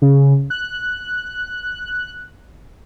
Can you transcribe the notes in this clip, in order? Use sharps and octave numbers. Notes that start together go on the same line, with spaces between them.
C#3
F#6